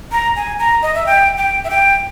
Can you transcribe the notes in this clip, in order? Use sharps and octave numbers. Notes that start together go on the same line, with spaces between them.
A#5
G#5
A#5
D#5
E5
G5
G5
E5
G5